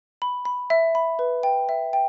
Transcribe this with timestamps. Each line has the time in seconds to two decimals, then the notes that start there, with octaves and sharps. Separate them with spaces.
0.22 B5
0.45 B5
0.70 E5
0.95 B5
1.19 B4
1.43 G5
1.69 E5
1.93 G5